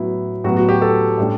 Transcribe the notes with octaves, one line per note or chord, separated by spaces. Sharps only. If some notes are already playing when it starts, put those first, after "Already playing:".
Already playing: A2 F#3 B3 E4
A2 F#3 B3 F#4
F#4
G4
A4
A2 G3 D4